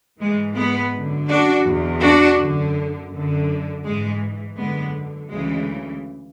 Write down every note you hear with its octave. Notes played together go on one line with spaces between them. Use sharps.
G#2 E3 G#3
G#3 B3
F#2 D3
D4 F#4
E2 B2
D4 F#4
F#2 D3
F#2 D3
G#2 E3 G#3
F#2 D3 G#3 B3
D2 C#3 E3 G#3